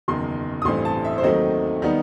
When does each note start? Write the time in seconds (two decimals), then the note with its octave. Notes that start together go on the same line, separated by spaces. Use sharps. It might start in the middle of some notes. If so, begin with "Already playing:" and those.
0.08 F#1 E2 D#3 C6
0.62 D#6
0.65 A1 G2 E3 A3 C4 C6
0.85 A5
1.05 E5
1.18 C5
1.23 D#2 D#3 F#3 A3 C4 D#5
1.82 D#3 G3 B3 D#4